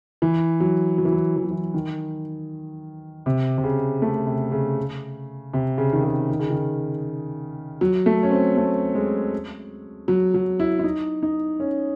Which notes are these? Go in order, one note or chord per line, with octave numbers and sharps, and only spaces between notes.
E3
F#3
F#3
E3
F#3
E3
F#3
E3
D#3
C3
C3
C#3
A3
C3
C#3
C3
C#3
D#3
C#3
D#3
C#3
D#3
F#3
A3
C#4
C4
A3
G#3
F#3
F#3
E4
E4
D#4
D#4
C#4